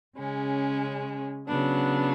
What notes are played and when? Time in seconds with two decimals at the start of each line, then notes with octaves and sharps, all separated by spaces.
0.17 C#3 G#3 C#4
1.48 C#3 F#3 B3 D4